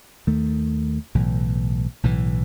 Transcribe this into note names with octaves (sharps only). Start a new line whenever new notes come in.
D#2 D#3 A3
B1 A2 E3
B1 A2 E3